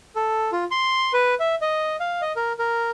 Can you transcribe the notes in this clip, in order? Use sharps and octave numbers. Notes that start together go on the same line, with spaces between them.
A4
F4
C6
B4
E5
D#5
F5
D#5
A#4
A#4